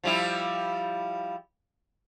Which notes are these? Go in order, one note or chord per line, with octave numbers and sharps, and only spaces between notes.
F3 G3 E4